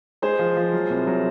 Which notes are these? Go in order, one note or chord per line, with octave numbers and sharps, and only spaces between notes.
G#3 G#4 C5
F3
F3
F#3
C2
F#3